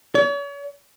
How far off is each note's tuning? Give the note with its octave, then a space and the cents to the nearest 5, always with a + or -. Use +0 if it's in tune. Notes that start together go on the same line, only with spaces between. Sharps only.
C#5 +40